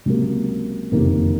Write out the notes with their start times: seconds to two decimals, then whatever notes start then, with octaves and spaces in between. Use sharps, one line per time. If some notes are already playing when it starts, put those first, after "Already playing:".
0.06 C#2 C3 F#3 A#3
0.92 F#1 F2 C3 D#3 A#3